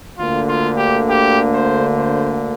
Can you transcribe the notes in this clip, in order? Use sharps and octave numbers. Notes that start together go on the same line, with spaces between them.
D2 D3 A#3 F4
F4
G4
G4
C5
C5